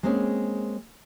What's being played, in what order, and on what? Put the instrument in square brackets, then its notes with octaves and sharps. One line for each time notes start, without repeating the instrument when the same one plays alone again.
[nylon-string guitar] G#3 A#3 C4 C#4 G#4